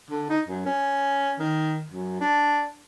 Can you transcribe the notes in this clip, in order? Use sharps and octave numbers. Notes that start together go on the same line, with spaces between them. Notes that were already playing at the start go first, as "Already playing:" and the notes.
D3
D#4
F#2
C#4
D#3
F#2
D4